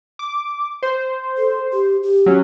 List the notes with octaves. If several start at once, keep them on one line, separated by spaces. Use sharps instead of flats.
D6
C5
A4
G4
G4
F#3 C#4